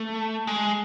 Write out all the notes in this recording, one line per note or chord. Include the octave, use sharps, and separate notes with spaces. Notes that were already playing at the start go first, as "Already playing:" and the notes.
Already playing: A3
G#3